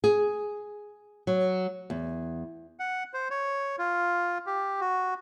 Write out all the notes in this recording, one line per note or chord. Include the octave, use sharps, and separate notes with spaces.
G#4
F#3
E2
F#5
C5
C#5
F4
G4
F#4